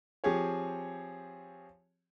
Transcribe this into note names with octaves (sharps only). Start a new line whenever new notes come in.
F3 C4 G4 G#4 C#5